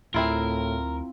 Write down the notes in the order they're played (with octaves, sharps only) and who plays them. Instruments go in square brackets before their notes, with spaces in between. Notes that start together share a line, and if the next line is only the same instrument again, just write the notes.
[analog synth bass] D2 [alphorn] A2 [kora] C4 E4 F4 [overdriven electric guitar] A#4